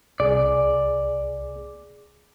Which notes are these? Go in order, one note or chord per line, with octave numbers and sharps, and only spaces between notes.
C2 G#4 D5